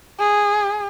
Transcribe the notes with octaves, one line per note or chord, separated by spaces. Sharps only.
G#4